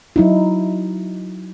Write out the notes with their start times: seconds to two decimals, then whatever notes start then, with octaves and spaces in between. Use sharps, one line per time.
0.16 F#3 D#4 E4